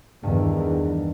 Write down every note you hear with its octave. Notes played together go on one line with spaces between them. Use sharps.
E2 G2 D#3